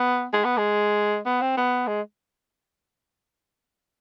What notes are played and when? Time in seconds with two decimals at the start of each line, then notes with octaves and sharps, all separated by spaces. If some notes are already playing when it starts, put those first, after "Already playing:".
Already playing: B3
0.33 G#3
0.44 B3
0.57 G#3
1.25 B3
1.41 C4
1.57 B3
1.87 G#3